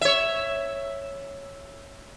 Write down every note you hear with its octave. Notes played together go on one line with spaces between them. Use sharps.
C#5 E5